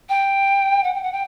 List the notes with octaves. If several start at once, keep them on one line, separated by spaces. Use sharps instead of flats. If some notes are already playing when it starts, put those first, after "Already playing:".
G5
F#5
G5
F#5
G5